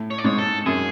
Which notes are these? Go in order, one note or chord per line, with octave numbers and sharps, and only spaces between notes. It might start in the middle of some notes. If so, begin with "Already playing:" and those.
Already playing: A2
C#5
D5
G#2 C#5
A4
F#2 G#4